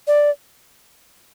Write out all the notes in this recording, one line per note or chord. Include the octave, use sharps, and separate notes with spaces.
D5